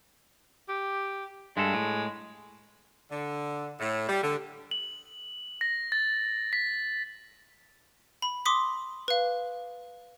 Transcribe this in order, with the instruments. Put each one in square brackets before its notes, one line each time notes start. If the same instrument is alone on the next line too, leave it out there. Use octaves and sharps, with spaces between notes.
[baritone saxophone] G4
[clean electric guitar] G2 A4 [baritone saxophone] G#3
[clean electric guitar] A2
[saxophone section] D3
A2
G3
D3
[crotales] F#7
A#6
A6
B6
[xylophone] B5
C6 D6 D#6 B6
B4 F5